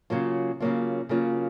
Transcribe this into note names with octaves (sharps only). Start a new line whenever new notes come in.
C#3 F#3 A#3 F4
C#3 F#3 A#3 F4
C#3 F#3 A#3 F4